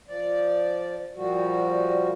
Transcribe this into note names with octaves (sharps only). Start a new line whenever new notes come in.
F3 D5
A#2 F3 G3 F#4